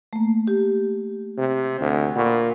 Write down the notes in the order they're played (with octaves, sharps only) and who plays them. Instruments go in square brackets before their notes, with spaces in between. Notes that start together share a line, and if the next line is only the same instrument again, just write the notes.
[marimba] A3 A#3
G4
[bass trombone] C3
D2
[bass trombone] A#2 [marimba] F#5 B5 C#6